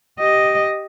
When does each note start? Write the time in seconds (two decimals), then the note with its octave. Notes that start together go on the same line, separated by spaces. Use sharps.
0.19 G4 D#5